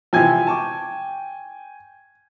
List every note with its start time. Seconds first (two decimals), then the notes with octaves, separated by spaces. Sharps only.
0.13 C3 E3 F3 G5 G#5 G#6
0.47 A5 C#6 D6